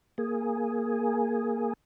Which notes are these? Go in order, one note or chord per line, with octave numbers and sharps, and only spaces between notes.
A#3 G#4